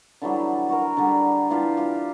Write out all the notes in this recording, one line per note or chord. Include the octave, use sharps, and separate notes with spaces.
D3 E3 F#3 G3
F#4 A#4
D3 G3 G4
E3 D4 F4 G4
F4 G4